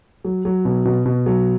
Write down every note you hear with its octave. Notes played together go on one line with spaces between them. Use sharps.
F#3
F#3
B2
B2
B2
F#3